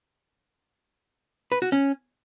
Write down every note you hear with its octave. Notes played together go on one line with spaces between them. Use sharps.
B4
F#4
C#4